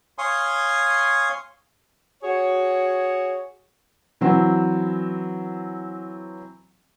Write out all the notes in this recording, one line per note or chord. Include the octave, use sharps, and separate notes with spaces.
C#5 F5 G#5 C6 C#6 D#6
F#4 G#4 C#5
E3 F#3 C4